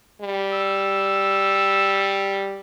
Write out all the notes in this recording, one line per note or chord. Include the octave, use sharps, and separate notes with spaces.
G3
E6